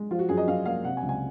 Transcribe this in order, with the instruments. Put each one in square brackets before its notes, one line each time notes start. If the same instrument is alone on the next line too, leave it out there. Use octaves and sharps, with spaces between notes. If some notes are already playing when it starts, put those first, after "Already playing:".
Already playing: [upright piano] G#3
F3 F4
F#4
F#2 G#4
D#5
F#2 F5
A#3 F5
C3 F#5
G#5
C#2
G#5